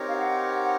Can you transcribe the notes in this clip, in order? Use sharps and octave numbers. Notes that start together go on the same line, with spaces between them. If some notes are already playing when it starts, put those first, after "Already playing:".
Already playing: C4 D#4 G4 A#4 C#5
F5
F#5
F#5